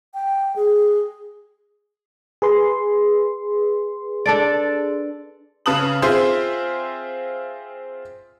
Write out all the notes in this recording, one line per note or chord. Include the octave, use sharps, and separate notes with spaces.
G5
G#4
G#4 B4 C6
D4 A4 D5
C#3 B4 A5 D#6 F#7
C4 F4 G#4 C5 E5 C6